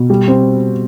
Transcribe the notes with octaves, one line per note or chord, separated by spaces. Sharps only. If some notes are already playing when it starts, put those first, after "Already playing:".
Already playing: B2
G3
C4